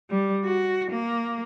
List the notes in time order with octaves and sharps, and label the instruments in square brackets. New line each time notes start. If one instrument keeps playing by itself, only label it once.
[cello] G3
F#4
A#3